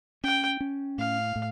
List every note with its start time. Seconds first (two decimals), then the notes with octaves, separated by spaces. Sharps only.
0.24 C#4 G5
0.60 C#4
0.98 A2 F5
1.36 A2